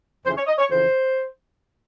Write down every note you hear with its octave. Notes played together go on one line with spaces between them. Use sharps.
F2 C#3 E3 C5
C#5
D#5
C#5
F2 C#3 E3 C5